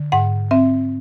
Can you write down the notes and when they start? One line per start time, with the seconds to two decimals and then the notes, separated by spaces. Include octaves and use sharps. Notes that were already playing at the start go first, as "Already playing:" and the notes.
Already playing: D3
0.12 G#2 F#5
0.51 C4 E5